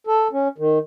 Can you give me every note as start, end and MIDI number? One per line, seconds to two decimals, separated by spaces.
0.07 0.28 69
0.33 0.48 61
0.58 0.78 51